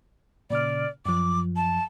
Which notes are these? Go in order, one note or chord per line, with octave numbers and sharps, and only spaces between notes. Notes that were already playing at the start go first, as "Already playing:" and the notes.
A#2 C#3 D5 F6
F#2 F3 D6
A5